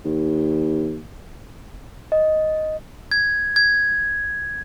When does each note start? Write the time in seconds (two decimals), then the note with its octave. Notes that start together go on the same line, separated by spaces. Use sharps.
0.05 D#2
2.12 D#5
3.11 G#6
3.56 G#6